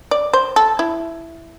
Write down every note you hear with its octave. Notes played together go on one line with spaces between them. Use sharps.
D5
C5
A4
E4